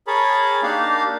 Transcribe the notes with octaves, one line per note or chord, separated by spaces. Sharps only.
G#4 A#4 C#5 A5 B5
A#3 D4 D#4 G4 F5 A5